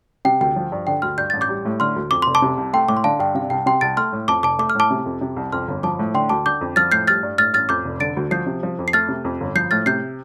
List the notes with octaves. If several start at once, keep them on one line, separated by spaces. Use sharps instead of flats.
C3 G5
D2 G5
F3
G2
D3 G5
D2 C6 F6
G2 G6
A1 A6
D6 G6
G3
A2
D3 C6 F6
D2
F2 D6
F1 C6
A5 D6
C3
C2
A3 G5 C6
A2 D6
C6
D3 F5 A5
G2 G5
C3 F5
C2 G5
C3 G5 C6
C2 A6 D7
A3 C6 F6
A2
F2 A5 D6
F1 A5 D6
A3 D6
F6
A2 A5 D6
C3
F2
C3
C2
F2 C6 F6
G1
F3 A5 D6
A2
D3 G5 C6
D2 A5 D6
D3 D6 G6
F2
F3 F6 A6
A2 G6 C7
G3 F6 A6
G2
A2 F6 A6
A1 F6 A6
F2 D6 G6
F1
D3 A6 D7
D2
F3 G6 C7
C3
F3
F2
C7
A3 F6 A6
C3
F2
G1
F3 G6 C7
A2 F6 A6
C3 G6 C7